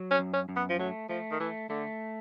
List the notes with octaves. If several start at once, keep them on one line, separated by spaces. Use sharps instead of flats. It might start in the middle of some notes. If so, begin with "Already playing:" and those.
Already playing: F#3
C#4
F#2
C#4
F#2
B3
F3
F#3 A3
F3 A3
D#3
E3 A3
D3 A3